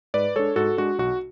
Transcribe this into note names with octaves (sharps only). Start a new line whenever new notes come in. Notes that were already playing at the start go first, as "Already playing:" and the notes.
G#2 B4 D5
G#3 D4 A4 C#5
G#2 F#4 A4
G#3 D4 F#4
B1 F#4